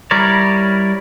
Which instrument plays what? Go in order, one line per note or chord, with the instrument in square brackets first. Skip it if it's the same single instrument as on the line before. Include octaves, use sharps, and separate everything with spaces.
[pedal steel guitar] G3 E4 A#4 C#5 D5